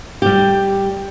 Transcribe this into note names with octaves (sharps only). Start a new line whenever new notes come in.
G3 G4